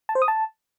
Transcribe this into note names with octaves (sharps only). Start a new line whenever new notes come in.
A5
C5
D#6
A5